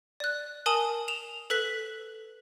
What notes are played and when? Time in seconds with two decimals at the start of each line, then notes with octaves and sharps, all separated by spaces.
0.20 D5 F#6
0.66 A#4 G#5 A5 D#6 F#7
1.08 E7 F7
1.50 A4 B4 F#6 B6 F#7